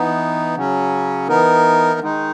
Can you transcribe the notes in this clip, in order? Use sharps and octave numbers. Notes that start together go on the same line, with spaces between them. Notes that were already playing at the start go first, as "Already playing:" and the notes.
Already playing: E3 B3 D#4
C#3 F#3 C#4
E3 B3 D#4 A#4
D#3 G#3 D#4